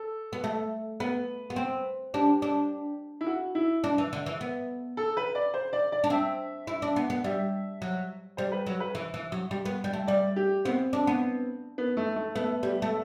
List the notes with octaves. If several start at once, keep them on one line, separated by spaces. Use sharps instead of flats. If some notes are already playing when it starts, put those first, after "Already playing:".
Already playing: A4
B3
A3
B3 B4
B3
C4
D4 G4
D4
E4
F#4
E4
D4
E3
D3
E3
B3
A4
B4
D5
C5
D5
D5
D4
C4 E5
E4
D4
B3
B3
G3 E5
F#3
G3 C5
B4
F#3
B4
E3
E3
F#3
G3
B3
G3
A3
G3 D5
G4
B3 C4
D4
B3
B3
A3
A3
A3 B3
G3
A3